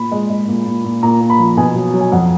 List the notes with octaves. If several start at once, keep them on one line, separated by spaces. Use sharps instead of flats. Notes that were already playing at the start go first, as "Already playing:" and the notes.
Already playing: A#2 B5
G#3
G#3
A#2
A#2
A#2
A#2 A#5
A#2
B5
F3
B2 G#5
F#3
F#3
G#5
F2 F#5